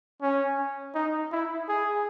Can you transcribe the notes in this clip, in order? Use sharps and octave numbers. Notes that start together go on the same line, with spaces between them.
C#4
D#4
E4
G#4